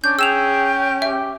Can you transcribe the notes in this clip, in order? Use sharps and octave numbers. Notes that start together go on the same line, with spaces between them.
C#4 D4 G6
G#4 G5 E6 E7 F7
G4 E5